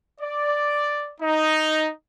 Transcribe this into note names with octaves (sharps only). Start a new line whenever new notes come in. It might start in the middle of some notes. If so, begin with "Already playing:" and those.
D5
D#4